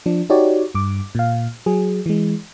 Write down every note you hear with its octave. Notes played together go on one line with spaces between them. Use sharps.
F3 D4
D#4 F#4 G4 C#5 D5
G2 D6
A#2 F5
F#3 G#4
E3 G#3